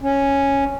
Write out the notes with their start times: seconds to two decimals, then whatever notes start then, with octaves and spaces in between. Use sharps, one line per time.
0.01 C#4